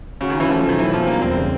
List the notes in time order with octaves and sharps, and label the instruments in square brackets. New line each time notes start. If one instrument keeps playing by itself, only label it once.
[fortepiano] C#3 [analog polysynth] F#3
[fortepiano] D#3
[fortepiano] E3 [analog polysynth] C#4
[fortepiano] F3 [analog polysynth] A3
[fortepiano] F3
[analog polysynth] B2 [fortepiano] D#3
[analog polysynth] B2 [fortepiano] E3
[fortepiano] F3 [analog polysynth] C4
[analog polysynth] G3 [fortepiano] A#3
[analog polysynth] E2 [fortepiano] C4
[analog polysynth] C#3